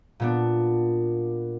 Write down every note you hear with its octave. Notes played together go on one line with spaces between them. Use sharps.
A#2 B3 D4